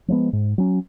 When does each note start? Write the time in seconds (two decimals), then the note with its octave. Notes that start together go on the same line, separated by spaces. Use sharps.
0.08 F3 G#3 B3
0.33 G#2
0.58 F#3 C#4